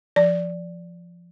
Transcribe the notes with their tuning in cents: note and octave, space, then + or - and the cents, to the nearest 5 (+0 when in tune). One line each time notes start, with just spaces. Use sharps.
F3 -10 D5 -5